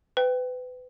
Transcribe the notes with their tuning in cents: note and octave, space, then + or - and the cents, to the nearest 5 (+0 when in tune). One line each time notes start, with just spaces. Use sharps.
B4 +30 G5 +0